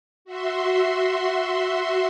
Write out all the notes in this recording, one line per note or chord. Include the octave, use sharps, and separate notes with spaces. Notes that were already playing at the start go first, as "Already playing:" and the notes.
F#4 E5 C6